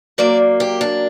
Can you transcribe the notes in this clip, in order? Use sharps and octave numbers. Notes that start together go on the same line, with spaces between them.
F#2 F#3 A#3 D5
G4
D4